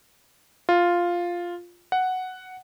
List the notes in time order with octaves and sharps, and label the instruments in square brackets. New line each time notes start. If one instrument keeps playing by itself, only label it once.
[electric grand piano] F4
F#5